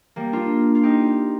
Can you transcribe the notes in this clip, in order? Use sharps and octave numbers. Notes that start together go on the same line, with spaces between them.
G3 A#3
D4 F4
F4
D#4 G4